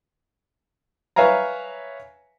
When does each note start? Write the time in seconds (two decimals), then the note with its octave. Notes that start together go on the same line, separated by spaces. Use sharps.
1.16 B4 C#5 E5 F5 G#5 A#5